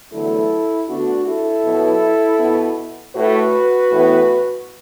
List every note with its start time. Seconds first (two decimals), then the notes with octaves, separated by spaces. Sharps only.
0.13 E2 D3 F#3 A3 E4 A4
0.89 D2 D3 B3 D4 F#4
1.27 E4 A4
1.65 B2 F#3 B3
2.40 B2 B3
3.16 A2 A3 F#4 B4
3.92 A2 E3 B3